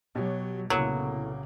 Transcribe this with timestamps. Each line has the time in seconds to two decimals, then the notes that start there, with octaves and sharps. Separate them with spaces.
0.15 B2 F#3 G4 C#5
0.70 C2 A#2 C#3 F#3 A#3 B3 E4 A4